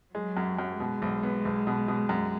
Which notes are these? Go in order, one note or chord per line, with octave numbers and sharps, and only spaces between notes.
F#3 G#3
F#2
F#2
B2 G#3
B1
B3
B1
B2
B2
F#2